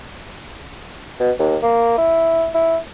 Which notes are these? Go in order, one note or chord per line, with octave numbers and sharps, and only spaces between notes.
B2
D#2
A#3
E4
E4